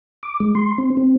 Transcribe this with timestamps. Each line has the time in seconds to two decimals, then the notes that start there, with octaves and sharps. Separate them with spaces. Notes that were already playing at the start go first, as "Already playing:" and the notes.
0.23 D6
0.40 G#3
0.55 C6
0.78 C4
0.97 C4